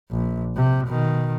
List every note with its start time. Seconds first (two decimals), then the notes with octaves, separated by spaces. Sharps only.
0.11 A#1
0.56 C3
0.87 B2 D#3